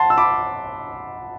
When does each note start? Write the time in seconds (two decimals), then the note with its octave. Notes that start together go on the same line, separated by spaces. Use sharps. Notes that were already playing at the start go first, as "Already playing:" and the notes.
Already playing: F#5 A5 C6
0.10 E6
0.17 B5 D6